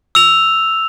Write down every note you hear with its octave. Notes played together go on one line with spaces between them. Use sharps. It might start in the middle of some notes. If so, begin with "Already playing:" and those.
E6 F7